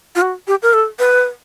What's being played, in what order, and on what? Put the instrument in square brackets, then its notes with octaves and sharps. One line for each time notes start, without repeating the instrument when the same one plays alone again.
[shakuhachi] F4
F#4
G4
A#4
A4
B4